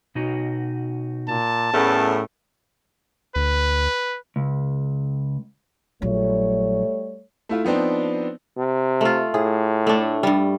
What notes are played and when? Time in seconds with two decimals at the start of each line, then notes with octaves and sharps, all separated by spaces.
0.15 B2 D#4 F#4
1.28 A#2 A5
1.73 E2 A2 A3 C#4 A#4
3.36 D2 B4
4.36 C#2
6.02 A#1 F#3 G3 A3 C#5
7.49 A3 E4 F4
7.65 F3 B3 C4 D4 D#4
8.58 C3
9.01 A3 F4
9.34 A2 G#4
9.87 A3 D4
10.23 G2 G3